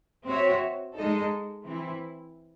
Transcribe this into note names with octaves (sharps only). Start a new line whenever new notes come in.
C4 F#4 C#5 E5
G#3 D#4 A4 D#5
E3 C4 E4